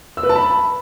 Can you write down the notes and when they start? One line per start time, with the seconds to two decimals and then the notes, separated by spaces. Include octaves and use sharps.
0.17 E6
0.23 B4
0.29 A5
0.36 B5